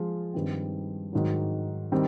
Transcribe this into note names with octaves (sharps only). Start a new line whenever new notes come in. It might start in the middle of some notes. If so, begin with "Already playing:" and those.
Already playing: F3 G#3 F4
G2 D#3 G3 C4
G#2 D#3 F#3
D#3 G3 C4